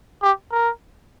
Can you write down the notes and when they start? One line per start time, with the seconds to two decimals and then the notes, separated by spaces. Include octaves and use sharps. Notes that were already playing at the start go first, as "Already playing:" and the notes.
0.23 G4
0.52 A#4